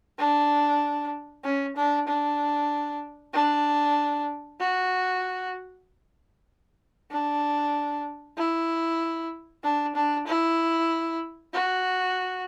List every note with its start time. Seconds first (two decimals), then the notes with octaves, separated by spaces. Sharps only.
0.18 D4
1.44 C#4
1.76 D4
2.07 D4
3.33 D4
4.60 F#4
7.11 D4
8.37 E4
9.64 D4
9.95 D4
10.27 E4
11.53 F#4